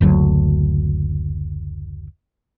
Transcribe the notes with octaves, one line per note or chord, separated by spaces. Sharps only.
F#1 D2 F#3